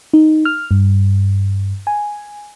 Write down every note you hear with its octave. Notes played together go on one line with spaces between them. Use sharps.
D#4
F6
G2
G#5